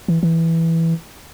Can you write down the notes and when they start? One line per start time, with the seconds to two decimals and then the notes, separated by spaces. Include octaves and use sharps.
0.08 E3
0.23 E3